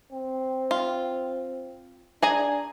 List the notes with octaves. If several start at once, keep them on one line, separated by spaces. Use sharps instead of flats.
C4
F4
D4 G#4 G#5 A#5